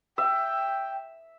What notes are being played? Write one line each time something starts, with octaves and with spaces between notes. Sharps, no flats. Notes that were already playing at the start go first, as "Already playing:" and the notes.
E5 G5